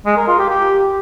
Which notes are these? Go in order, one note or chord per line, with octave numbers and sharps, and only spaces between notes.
G#3
A#4
F4
G4
G4